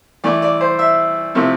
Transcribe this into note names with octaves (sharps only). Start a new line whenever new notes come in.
E3 A3 E4 D5
D5
C5
E5
C3 F3 A3 E4